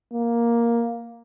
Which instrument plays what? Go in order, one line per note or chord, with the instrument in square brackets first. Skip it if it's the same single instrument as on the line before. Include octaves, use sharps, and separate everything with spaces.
[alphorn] A#3